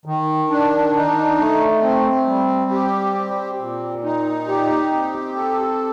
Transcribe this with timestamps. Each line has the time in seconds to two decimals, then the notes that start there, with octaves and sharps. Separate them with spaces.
0.05 D#3
0.50 D4
0.94 D#4
1.38 A3
1.82 C4
2.26 G3
2.71 G4
3.15 C4
3.59 A#2
4.04 D#4
4.48 G4
4.91 C4
5.36 A4